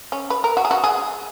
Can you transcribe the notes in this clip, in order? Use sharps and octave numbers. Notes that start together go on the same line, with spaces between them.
C#4
B4
A#4
F#4
G#4
F#4
G#4